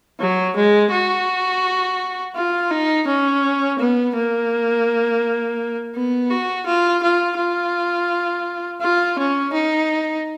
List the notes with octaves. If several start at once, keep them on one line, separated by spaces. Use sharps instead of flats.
F#3
G#3
F#4
F4
D#4
C#4
B3
A#3
B3
F#4
F4
F4
F4
F4
C#4
D#4